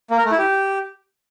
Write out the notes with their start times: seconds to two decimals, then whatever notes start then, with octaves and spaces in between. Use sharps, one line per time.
0.11 A#3
0.18 A#4
0.25 A3
0.32 E4
0.38 G4